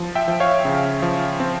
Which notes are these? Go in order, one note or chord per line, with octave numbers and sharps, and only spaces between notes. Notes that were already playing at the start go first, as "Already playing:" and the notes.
Already playing: F3
E5 G5
F3
C#5 F5
C#3
F3
C4